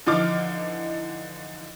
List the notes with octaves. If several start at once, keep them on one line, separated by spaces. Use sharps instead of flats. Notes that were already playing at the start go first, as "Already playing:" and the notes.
D3 E3 F3 D#4 D6 F6